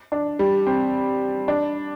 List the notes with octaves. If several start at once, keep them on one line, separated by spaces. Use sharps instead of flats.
D4
G3
C4
D4